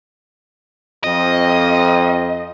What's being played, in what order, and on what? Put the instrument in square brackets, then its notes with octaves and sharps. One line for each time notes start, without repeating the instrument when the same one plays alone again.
[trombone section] F2 [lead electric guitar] D#5